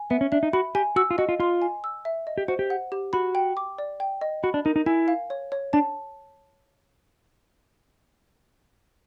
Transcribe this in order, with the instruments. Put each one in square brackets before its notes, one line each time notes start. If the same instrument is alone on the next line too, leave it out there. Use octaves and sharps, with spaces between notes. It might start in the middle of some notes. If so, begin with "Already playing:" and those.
Already playing: [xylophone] G#5
[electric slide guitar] B3 [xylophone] E5
[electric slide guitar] C#4
[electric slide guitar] D4 [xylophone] E5
[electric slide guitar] D#4
[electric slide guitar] F#4 [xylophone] B5
[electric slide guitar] G4 [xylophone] G#5
[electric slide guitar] F#4 [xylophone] E6
[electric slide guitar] F4
[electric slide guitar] F#4 [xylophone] D#5
[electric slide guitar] F4
[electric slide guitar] F4 [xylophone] C6
[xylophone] G#5
E6
E5
D#5
[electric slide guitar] G4
[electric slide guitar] F#4 [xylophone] C5
[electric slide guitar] G4
[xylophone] F#5
G4
[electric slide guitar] F#4 [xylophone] B5
[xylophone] G5
D6
D5
G5
D#5
[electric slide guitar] F#4 [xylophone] B5
[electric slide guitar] D4
[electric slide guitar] D#4 [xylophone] A#4
[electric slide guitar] D#4
[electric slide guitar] E4 [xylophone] G#5
[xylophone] F5
C#5
C#5
[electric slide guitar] D4 [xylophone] A5